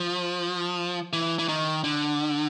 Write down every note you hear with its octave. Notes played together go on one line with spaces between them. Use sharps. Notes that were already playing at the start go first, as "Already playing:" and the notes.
Already playing: F3
E3
E3
D#3
D3